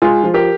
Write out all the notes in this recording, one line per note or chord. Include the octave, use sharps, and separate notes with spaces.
G#3 F4 G#4
F3
G4 A#4